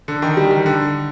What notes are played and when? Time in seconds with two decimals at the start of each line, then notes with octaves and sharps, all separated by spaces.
0.08 D3
0.22 D#3
0.37 G3
0.51 D#3
0.66 D3